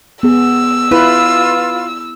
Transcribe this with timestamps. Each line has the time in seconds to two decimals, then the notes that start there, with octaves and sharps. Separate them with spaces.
0.23 B3 G#4 E6
0.91 E4 F4 B4